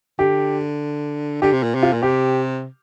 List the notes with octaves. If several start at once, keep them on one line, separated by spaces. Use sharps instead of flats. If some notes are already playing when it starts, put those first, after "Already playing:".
D3 G4
D3 G4
C3
A#2
C3
F4
A#2
C3 G4